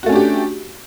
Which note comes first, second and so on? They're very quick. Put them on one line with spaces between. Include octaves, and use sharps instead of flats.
F#4 A3 C#4 D4 G4